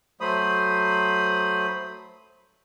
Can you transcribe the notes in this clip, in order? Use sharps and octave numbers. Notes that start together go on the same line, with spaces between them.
F#3 A3 C5 B5 D#6